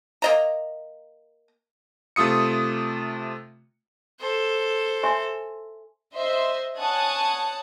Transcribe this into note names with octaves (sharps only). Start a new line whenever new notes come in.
A#3 D#5 A#5
C3 A3 F4 D#6 C#7
A4 C5
E5 G#5 C6
C5 D#5 E5 C6
C#5 F#5 G#5 A5 D#6 F#6